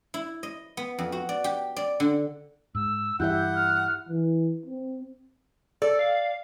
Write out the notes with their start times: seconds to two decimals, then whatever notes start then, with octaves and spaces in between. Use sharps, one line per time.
0.14 E4
0.43 D#5
0.77 B3
0.99 F2
1.12 F#4
1.29 D5
1.44 G4
1.76 D5
2.00 D3
2.75 G#2 E6
3.20 G2 E3 E4 G4 E5 F#5 G6
3.55 F6
4.09 E3
4.66 C4
5.82 A4 D5
5.99 F5